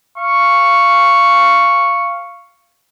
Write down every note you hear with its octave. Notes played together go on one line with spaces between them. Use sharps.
F5 C#6